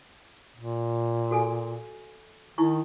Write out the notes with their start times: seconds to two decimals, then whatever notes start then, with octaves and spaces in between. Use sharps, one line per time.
0.56 A#2
1.31 F#4 A4 G#5
2.58 D#3 D#4 E4 C#6